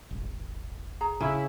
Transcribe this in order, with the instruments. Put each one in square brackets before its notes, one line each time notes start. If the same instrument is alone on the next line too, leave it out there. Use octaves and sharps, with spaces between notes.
[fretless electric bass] D#1 G#1
[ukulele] G#4 A#5
[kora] C#3 [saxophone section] E4